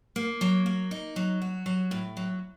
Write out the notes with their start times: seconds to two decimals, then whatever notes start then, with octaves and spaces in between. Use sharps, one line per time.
0.16 A#3
0.41 F#3
0.66 A#3
0.91 D#4
1.16 F#3
1.42 F#4
1.66 F#3
1.91 A2
2.17 F#3